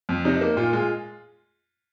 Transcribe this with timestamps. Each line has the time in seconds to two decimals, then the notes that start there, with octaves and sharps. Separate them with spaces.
0.09 F2
0.25 C3 D#4
0.41 A#3
0.57 A#2 F4
0.73 G#3 F4